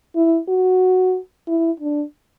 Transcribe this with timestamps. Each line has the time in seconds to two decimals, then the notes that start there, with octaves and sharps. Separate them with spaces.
0.16 E4
0.49 F#4
1.48 E4
1.80 D4